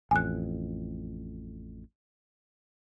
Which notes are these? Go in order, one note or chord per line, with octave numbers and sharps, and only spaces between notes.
A1 F2 G#5 F#6